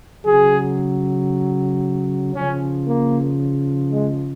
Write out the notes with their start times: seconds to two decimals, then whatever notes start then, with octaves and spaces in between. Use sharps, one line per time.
0.25 C#3 F#3 G#4
2.34 C#3 F3 C#4
2.87 A#3
3.91 G#3